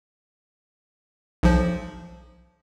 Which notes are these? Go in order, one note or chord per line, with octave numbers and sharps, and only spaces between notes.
B1 F3